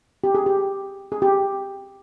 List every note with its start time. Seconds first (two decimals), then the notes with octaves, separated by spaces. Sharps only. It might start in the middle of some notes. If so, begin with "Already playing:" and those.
0.24 G4
0.35 G#4
0.46 G4
1.12 G#4
1.22 G4